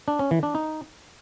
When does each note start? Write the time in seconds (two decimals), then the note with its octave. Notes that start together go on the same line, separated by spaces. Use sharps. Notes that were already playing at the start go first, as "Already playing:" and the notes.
0.08 D4
0.19 C#4
0.31 E3
0.43 D4
0.55 D#4